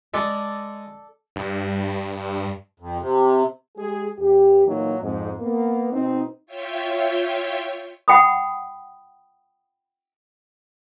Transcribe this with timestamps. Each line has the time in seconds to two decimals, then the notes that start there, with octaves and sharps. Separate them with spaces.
0.14 G#3 A4 D5
1.36 G2
2.80 F2
3.00 C3
3.77 G#3 G4 G#4
4.19 E2 G4
4.66 A#2 E3 F#3 A#3 D#4
5.01 F2 G#2
5.40 A#3 B3
5.93 B2 C4 D#4
6.46 F4 C#5 E5 G5
8.08 F#5 G5 B5 D#6